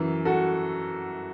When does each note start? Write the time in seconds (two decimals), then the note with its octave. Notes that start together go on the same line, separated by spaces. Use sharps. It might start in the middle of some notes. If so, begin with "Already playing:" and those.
Already playing: F#2 E3
0.25 F#4 A4